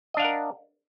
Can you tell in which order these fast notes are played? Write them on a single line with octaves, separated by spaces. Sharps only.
D#5 D4 F5 F#5 A#4